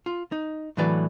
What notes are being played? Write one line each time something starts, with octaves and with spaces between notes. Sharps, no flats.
F4
D#4
A2 D3 E3 F#3 B4 D5